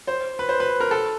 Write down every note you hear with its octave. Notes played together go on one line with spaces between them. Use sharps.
C5
B4
C5
B4
A#4
A4